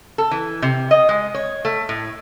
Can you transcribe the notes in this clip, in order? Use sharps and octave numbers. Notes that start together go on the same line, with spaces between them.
A4
E3
C3
D#5
G#3
C#5
A3
A2